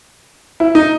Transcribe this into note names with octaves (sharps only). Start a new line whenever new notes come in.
E4
D#4